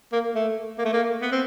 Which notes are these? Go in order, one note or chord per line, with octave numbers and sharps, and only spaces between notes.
A#3
A3
A#3
A3
A#3
B3
C4